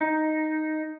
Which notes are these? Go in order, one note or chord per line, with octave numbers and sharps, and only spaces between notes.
D#4